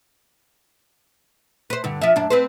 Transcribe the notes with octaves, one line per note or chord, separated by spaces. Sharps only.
B4 C5
G2 D3
F3 E5
F#2 D4
C4 B4 C5